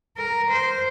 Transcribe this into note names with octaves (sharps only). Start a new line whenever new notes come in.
A#4
C5